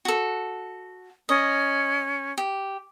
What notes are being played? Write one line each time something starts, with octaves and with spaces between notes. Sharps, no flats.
F#4 A4
C#4 D#5
G4